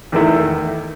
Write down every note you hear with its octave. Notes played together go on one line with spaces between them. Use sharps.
E2 D#3 A3 E4